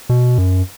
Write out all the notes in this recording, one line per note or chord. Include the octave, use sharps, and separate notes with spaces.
B2
F#2